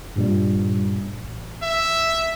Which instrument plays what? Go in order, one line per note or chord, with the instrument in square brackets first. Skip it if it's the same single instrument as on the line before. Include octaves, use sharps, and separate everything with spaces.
[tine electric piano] G2 A#2 G3
A1
[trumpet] E5